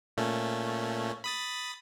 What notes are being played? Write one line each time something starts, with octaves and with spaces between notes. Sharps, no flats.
A#2 A3 C#4
B5 D#6 A6